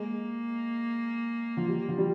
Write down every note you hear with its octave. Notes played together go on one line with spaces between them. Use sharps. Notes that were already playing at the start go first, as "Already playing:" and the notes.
Already playing: G#3 A#3
F3
G3
F3
G3